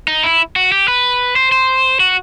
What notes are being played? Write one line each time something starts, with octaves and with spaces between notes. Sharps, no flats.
D#4
E4
F#4
G4
B4
C5
C5
F#4